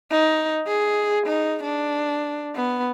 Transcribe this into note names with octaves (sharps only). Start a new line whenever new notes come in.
D#4
G#4
D#4
D4
B3